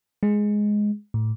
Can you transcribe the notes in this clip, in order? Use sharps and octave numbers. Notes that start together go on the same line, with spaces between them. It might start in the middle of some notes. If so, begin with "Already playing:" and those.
G#3
A2